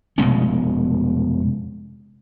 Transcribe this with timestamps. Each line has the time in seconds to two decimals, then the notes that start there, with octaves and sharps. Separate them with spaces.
0.18 F1 B2 G#3 C#4